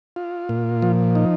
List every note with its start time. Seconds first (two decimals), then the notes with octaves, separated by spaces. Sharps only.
0.16 F4
0.49 A#2
0.82 F3
1.15 D#4